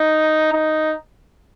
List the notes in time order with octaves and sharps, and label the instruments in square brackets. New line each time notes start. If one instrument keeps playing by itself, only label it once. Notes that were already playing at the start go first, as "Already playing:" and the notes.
Already playing: [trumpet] D#4
D#4